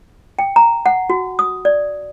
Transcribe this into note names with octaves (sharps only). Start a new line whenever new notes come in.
G5
A#5
F#5
F#4
D#6
D5